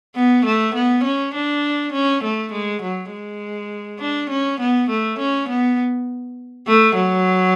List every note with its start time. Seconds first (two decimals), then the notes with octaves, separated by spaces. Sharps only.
0.16 B3
0.45 A3
0.75 B3
1.04 C#4
1.35 D4
1.93 C#4
2.23 A3
2.52 G#3
2.82 F#3
3.12 G#3
4.00 D4
4.30 C#4
4.60 B3
4.90 A3
5.19 C#4
5.49 B3
6.67 A3
6.96 F#3